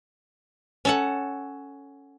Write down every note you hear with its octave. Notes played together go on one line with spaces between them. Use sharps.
C#4 A4 F#5